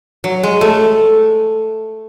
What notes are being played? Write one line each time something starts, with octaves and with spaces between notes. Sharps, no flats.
F#3
G#3
A3